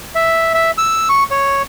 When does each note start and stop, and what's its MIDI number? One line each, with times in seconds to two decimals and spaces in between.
0.15 0.53 76
0.54 0.71 76
0.78 1.08 88
1.09 1.24 85
1.31 1.62 73